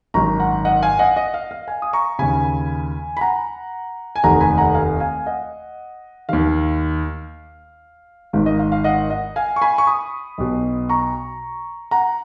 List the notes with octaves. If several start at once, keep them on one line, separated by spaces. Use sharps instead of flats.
G#1 F#2 D#3 A#5 C#6
F#5 A#5
D#5 F#5
F5 G#5
D#5 F#5
D#5 F#5
F5
F5
F5 G#5
D#6
A#5 C#6
D#2 C#3 G#5 B5
B5
F#5 A#5
G#5
F1 D#2 D#3 F#5 A#5
G#5 B5
F#5 A#5
F5 G#5
F5 G#5
D#5 F#5
D#2 D#3 F5
G#1 G#2 D#3 F5
D#5
F5
F5
D#5 F#5
D#5 F#5
F5 G#5
C#6
G#5 B5
C#6
B5 D#6
B1 B2
A#5 C#6
F#5 A#5